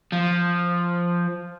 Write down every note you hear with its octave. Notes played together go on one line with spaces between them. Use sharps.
F3